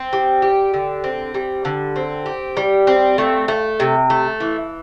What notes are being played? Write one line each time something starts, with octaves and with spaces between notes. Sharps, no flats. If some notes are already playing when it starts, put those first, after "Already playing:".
Already playing: C4
G3
G4
D3
C4
G3
D3
C4
G4
G3
C4
A3
A3
C3
A3
E3